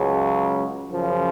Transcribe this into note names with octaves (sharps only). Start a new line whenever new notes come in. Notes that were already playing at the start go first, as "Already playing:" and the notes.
Already playing: C#2 C#3 F#3
F#2 C#3 F3